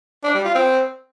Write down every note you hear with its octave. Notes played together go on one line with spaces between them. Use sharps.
D4
G3
F4
C4